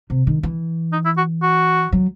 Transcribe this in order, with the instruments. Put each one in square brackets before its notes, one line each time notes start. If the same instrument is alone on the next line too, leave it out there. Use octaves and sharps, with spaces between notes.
[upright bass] C3
D#3
E3
[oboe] D#4
E4
F#4
F#4
[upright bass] F#3